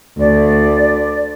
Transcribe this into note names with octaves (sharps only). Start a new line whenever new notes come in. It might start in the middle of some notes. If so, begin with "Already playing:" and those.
D2 D5